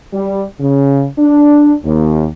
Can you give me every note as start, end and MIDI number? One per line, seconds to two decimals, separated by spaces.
0.13 0.43 55
0.60 1.05 49
1.18 1.72 62
1.84 2.26 39